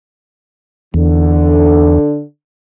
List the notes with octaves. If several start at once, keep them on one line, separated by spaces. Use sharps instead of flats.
E2 D3